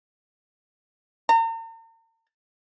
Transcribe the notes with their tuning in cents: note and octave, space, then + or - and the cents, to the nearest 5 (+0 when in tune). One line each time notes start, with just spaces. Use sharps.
A#5 -45